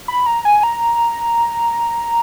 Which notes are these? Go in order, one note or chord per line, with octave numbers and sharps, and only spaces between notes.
B5
A#5
G#5
A#5